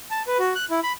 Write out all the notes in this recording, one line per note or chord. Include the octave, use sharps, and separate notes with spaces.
A5
B4
F#4
F#6
E4
B5